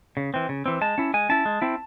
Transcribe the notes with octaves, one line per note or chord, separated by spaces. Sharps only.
C#3
E3 C4
C#3
E3 C4
G#3 A5
C#4 E4
G#3 G#5
C#4 E4 A5
G#3
C4 E4